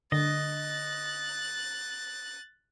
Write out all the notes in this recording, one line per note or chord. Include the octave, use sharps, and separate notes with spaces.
D3 D#5 F#6 A6